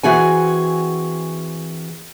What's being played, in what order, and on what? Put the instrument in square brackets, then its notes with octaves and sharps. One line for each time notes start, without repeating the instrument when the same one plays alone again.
[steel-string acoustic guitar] E3 C4 F#4 G#4 F#5 G#5